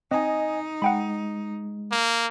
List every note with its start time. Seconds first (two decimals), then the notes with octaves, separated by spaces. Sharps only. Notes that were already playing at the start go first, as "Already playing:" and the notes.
0.11 C4 D#4 D#5 G#5
0.82 G#3 F#5 G5 B5
1.92 A#3